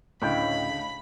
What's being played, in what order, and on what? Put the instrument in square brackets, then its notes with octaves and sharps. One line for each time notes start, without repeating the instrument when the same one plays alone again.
[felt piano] D2 C#3 [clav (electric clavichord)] A2 G5 [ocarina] D#5 [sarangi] B5